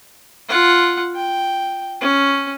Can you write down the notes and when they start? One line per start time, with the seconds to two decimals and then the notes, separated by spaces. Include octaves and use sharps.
0.48 F4 F#5
1.16 G5
2.01 C#4